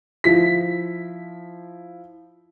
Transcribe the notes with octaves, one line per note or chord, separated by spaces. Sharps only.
F3 E4 B6